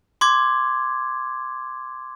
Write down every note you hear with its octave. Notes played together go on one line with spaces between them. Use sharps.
C6 D6 G#6